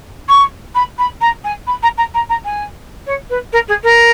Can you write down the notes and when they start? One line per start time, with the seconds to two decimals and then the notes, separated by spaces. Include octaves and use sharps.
0.29 C#6
0.75 B5
0.98 B5
1.21 A#5
1.44 G#5
1.67 B5
1.82 A#5
1.97 A#5
2.14 A#5
2.29 A#5
2.44 G#5
3.06 C#5
3.30 B4
3.52 A#4
3.68 G#4
3.83 A#4